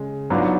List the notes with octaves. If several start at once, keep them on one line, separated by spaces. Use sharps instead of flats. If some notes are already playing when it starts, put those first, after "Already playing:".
Already playing: C#3 G#3
G#2 F#3 B3 D4 F4